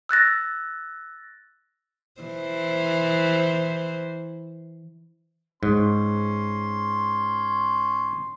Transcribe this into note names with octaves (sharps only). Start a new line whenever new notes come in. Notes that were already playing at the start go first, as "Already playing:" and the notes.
E6 F#6 A6 A#6
E3 C5
G#2 C#4 C6